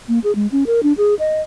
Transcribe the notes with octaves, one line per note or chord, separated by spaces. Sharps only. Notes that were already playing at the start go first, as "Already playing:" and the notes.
A#3
G#4
G#3
C#4
A#4
D4
G#4
D#5